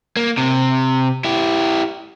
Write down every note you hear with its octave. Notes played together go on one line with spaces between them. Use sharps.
A#3
C3
E4 G4